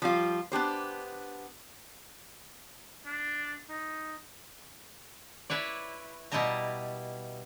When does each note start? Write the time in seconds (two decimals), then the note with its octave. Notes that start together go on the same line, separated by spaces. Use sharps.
0.02 F3 G3 F4
0.52 B3 D4 G4 C5
3.06 D4
3.70 D#4
5.50 E4 B4 C#5 D5
6.32 B2 G3 E4 D#5 A5 A#5